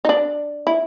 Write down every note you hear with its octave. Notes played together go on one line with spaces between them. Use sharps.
D#4
D4
E4